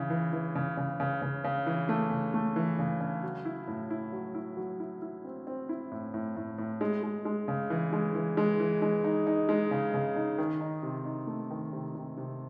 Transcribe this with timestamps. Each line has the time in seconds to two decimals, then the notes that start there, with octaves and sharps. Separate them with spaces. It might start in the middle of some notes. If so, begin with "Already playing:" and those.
Already playing: C#3 E3
0.10 E3
0.33 E3
0.55 C#3
0.77 C#3
1.00 C#3
1.22 C#3
1.44 C#3
1.66 E3
1.89 A3
2.11 C#3
2.34 A3
2.56 E3
2.79 C#3
3.00 C#3
3.23 F#3
3.45 E4
3.68 A2
3.90 E4
4.13 F#3
4.35 E4
4.57 F#3
4.80 E4
5.02 E4
5.24 C4
5.47 C4
5.69 E4
5.92 A2
6.14 A2
6.36 A2
6.58 A2
6.81 G#3
7.03 G#3
7.25 G#3
7.48 C#3
7.70 E3
7.93 G#3
8.15 E3
8.37 G#3
8.60 E3
8.82 G#3
9.04 D#4
9.27 D#4
9.49 G#3
9.71 C#3
9.94 C#3
10.16 D#4
10.38 D#3
10.61 D#4
10.83 C3
11.05 D#4
11.27 A3
11.50 D#3
11.73 C3
11.95 C3
12.17 C3